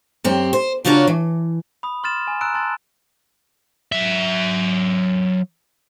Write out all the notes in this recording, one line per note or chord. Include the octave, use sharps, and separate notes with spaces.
F#2 C4 G4
C5
C#3 D4 F4 F#4 A#4 C#5
E3
B5 D#6
C6 F6 A6 E7
G#5
A#5 E6 F#6 D7
A5 C6 A6
F#3 E5